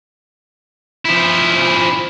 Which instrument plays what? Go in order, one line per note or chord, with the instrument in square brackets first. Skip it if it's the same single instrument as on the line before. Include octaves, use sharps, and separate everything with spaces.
[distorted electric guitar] F3 E4